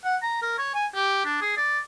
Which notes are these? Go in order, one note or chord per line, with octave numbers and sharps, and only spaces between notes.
F#5
A#5
A#4
C#5
G#5
G4
D4
G#4
D5